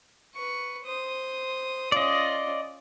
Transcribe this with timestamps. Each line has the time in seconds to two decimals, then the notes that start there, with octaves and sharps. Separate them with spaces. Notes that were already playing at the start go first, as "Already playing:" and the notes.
0.35 B4 C#6
0.85 C5 D#6
1.92 C#4 F4 D5 D#5